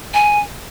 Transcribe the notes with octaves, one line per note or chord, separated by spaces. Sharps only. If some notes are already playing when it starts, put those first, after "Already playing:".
G#5